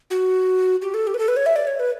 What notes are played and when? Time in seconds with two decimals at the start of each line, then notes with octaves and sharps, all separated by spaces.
0.10 F#4
0.82 G4
0.94 A4
1.07 G4
1.14 B4
1.19 A4
1.28 B4
1.36 C#5
1.46 E5
1.56 D5
1.67 C#5
1.79 B4